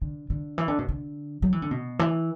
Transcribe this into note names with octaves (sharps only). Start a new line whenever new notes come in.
D3
D3
E3
D3
B2
D3
F#3
E3
D3
B2
E3